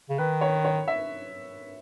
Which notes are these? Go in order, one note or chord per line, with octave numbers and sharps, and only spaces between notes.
C#3
D#3 B4
C#5
C#5
E5